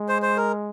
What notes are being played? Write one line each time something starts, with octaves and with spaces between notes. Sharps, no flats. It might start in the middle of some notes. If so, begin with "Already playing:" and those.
Already playing: G#3
C5
C5
A#4